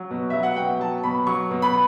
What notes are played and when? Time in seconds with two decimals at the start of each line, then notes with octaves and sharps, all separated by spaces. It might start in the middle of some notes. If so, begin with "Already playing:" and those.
Already playing: F#3
0.11 B2
0.30 F#3 E5
0.43 F#5
0.56 B2 G5
0.80 F#3 A5
1.04 B2 B5
1.27 F#3 C#6
1.51 B2
1.62 B5